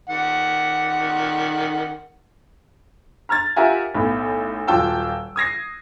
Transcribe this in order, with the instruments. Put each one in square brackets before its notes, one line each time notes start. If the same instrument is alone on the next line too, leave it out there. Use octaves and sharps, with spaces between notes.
[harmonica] D#3 F#5
[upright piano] A#5 F6 G#6 A6
F4 G4 A#4 E5 F#5 G#5
B1 A2 B3
D#1 F#3 F4 G5 A5 E6
D#6 G#6 A#6 C7